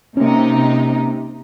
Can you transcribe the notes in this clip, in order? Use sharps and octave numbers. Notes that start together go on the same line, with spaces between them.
C3 A#3 C#4 D#4